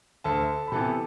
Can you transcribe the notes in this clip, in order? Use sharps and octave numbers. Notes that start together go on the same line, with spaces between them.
D2 A4 A5
B5
C3 E3 B3 A4 A5